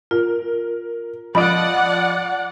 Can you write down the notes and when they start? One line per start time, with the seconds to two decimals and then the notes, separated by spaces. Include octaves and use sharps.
0.11 F4 A#4
1.35 F3 D5 D#5 F#5 B5 D7